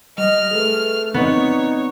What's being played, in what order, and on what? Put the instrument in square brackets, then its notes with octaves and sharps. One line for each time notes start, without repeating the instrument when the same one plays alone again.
[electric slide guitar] G3 [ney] D#5 [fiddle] F6
[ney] A3 [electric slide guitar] G#4 A4 B4
[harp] B3 [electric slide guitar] C4 D5 [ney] D#4 [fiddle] C#5